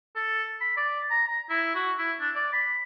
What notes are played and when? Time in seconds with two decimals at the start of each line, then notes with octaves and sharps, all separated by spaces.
0.15 A4
0.61 B5
0.77 D5
1.10 A#5
1.27 A#5
1.49 E4
1.75 F#4
1.98 E4
2.20 D4
2.35 D5
2.53 B5